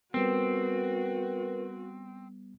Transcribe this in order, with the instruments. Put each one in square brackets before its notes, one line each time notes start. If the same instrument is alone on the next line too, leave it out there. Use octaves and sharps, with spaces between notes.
[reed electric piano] G3 B3 [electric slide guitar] C4 [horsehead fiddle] F#4 [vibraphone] A#4 B4